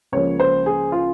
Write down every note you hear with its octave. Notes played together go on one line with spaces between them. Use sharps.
C#2 C#3 F3 A#3 C#5
C5
G#4
F4